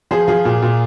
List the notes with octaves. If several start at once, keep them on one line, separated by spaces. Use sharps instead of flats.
F3 G#4 C5
F3 F4 G#4
A#2
A#2